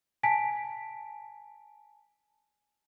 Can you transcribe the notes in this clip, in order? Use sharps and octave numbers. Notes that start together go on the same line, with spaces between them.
G#5 A5 B6 D7